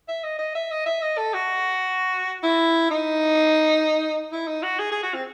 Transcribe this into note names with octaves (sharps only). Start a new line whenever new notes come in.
E5
D#5
D#5
E5
D#5
E5
D#5
A4
F#4
E4
D#4
E4
D#4
F#4
G#4
G#4
F#4
C4